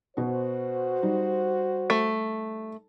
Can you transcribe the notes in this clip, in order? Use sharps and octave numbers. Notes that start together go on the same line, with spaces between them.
B2 B3 F#4 C5
G3 D#4
A3